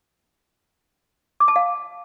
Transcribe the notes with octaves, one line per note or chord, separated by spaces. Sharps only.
D6
A5
F5